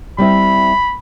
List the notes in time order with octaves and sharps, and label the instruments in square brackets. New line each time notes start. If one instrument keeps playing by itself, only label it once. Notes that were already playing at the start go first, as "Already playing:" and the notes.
[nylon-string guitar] G3 C4 E4 [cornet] B5